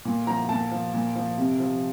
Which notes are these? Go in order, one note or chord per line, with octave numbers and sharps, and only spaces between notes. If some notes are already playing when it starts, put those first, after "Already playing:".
A#2
F3 A#5
A#2 A5
F3
A#2
F3
C3
F3